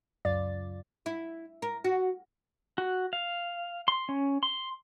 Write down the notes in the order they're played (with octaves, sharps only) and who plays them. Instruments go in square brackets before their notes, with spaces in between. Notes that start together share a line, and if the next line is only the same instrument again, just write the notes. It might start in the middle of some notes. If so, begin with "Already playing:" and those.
[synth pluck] C#2 F#2 F4 D5 A6
[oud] E4
A#4
F#4
[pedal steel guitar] F#4
F5
C6
C#4
C6